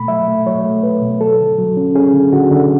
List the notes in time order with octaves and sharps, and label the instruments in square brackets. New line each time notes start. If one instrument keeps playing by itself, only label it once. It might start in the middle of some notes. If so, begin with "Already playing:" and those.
Already playing: [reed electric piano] B2 A3 B5
F#3 E5
A3
F#3 C#5
A3
A3 B4
B2
F#3 A4
D3
F#3
C#4
C#4 G#4
D3
D3 F#4
D3